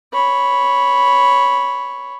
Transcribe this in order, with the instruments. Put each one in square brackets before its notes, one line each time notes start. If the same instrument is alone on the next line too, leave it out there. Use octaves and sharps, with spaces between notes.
[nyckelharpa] C#5 B5